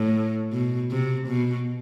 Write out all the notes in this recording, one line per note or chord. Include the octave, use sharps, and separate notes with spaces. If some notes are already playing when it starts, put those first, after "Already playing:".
Already playing: A2
B2
C3
B2